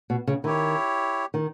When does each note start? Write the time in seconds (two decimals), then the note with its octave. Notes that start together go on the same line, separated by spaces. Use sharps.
0.10 B2
0.27 C#3
0.43 D#3 E4 G4 C#5
1.34 D#3